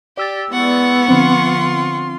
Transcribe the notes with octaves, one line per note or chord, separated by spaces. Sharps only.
G4 D5 E6 A6
E3 G#3 B3 F#5 C#6
D3 F3 C4 F4 C6